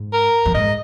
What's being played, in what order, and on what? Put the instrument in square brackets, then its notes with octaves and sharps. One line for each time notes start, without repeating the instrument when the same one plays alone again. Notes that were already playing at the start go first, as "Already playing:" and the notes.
Already playing: [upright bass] G#2
[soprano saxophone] A#4
[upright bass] F#2
[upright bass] G#2 [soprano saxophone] D#5